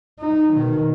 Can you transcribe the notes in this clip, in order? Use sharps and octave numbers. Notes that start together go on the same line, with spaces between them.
D#4
B2 D#3